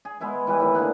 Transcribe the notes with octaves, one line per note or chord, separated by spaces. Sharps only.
G#4
G#3 B3 E4 G#5
E3 G3 B4
A2 D#3
D3 A#3 G#4 F#5